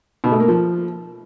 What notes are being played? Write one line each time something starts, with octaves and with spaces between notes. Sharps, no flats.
B2
A3
A#3
F3